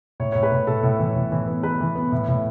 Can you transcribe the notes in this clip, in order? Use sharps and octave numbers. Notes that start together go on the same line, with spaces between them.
A2 C#5
A2 C#5
B4
A2
A2 A4
A2
E3
A2
E3
B3
B3 B4
E3
B3
A2
A2